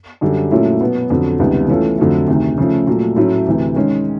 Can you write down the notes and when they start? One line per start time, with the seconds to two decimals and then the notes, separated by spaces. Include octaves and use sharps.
0.21 F#2 D3 G3
0.51 A#2 F#3 A3 C#4 E4
0.81 B2 F#3 B3
1.10 F2 D3 F#3
1.39 C#2 C3 D#3 G3 B3
1.69 E3 A3 C#4 F4 A4
1.98 F2 D3 F#3 A3
2.28 D2 C3 D#3
2.58 C#3 F3 A3
2.87 A#2 F#3 A3
3.16 A2 F#3 A3 C#4 E4
3.47 D2 C3 E3
3.75 D#3 G#3 C#4